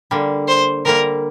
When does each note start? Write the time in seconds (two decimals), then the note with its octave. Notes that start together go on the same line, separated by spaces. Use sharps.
0.11 D3 G3 A#3
0.48 C5
0.85 D3 G3 A#3 A#4